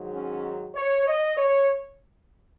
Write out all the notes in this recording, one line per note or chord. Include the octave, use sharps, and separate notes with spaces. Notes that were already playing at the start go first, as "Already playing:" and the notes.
Already playing: G#2 D#3 F#3
C#4
C#5
D#5
C#5